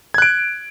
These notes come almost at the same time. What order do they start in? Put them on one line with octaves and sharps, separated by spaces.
G#6 F#6 D7